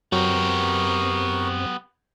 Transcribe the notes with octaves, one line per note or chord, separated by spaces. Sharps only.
F#2 F#3 B3 C4 G4 A#4 C#6